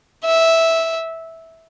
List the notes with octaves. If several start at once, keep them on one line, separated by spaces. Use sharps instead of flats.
E5